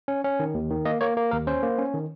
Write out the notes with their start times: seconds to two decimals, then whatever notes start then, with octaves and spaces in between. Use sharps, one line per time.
0.08 C#4
0.24 C#4
0.40 D#3
0.54 D#2
0.71 D#3
0.85 A#3 D#5
1.01 A#3 C#5
1.17 A#3
1.31 D#2 A#4
1.47 C#4 C5
1.63 A#3
1.78 C#4
1.94 D#3